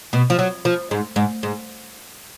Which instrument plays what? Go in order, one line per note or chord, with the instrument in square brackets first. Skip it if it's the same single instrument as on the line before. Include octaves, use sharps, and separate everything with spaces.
[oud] B2
F3
F#3
F3
G#2
G#2
G#2